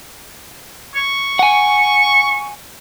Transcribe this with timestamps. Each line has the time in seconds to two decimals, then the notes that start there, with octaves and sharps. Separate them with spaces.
0.95 C#6
1.39 F#5 G#5